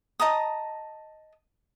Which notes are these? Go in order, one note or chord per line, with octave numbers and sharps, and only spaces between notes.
D#5 A5 A#5 D#6